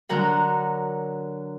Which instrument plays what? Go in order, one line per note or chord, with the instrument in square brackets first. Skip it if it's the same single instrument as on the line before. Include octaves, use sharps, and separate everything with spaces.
[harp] D3 F#3 A#4 F#5